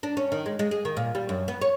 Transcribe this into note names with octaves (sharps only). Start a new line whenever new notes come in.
D4
C#4
D#3
G#3
G#3
G#4
D#3
A#2
G3
F#2
B3
C#5